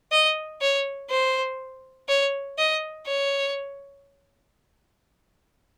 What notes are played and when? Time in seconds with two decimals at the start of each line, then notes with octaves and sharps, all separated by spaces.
0.12 D#5
0.62 C#5
1.11 C5
2.09 C#5
2.58 D#5
3.07 C#5